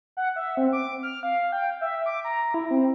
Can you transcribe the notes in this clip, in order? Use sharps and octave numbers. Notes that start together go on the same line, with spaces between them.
F#5
E5
C4
D6
F6
F5
G5
E5
D6
A#5
E4
C4